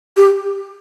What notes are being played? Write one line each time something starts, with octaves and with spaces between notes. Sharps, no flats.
G4